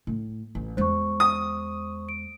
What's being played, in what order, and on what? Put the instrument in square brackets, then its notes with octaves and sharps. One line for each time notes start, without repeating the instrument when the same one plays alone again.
[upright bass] A2
A1
[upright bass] E2 G#3 [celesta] C5 C#6
[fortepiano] D#6
[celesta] D7